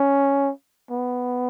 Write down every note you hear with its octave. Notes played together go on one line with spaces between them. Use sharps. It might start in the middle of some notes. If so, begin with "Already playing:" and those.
Already playing: C#4
B3